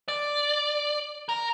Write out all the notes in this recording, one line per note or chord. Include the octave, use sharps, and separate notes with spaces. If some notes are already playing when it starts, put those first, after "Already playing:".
D5
A#4